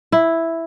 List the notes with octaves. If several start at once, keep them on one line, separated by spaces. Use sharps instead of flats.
E4